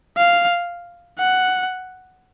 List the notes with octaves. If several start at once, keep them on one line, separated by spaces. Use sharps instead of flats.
F5
F#5